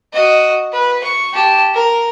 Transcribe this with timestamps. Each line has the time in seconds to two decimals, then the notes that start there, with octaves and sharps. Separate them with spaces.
0.13 F#4 D#5
0.72 B4
1.04 C#6
1.34 G4 A5
1.75 A#4